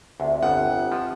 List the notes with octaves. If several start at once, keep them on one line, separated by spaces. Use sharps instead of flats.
D2 C3
G1 F2 F3 F#5
F3